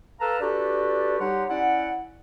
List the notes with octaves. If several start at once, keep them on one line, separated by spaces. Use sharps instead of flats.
A4 B4 F5 A5 A#5
D4 F#4 G4 A4 B4 D5
G3 D#4 G4 C#5 F#5 C6
C#4 E4 D5 F#5